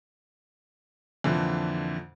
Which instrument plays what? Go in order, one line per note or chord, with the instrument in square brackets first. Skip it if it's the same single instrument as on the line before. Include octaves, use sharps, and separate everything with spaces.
[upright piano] F2 A#2 D3 E3